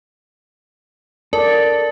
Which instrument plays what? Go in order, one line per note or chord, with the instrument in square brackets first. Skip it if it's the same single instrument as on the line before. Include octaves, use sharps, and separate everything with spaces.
[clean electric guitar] A4 [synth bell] A#4 [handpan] D5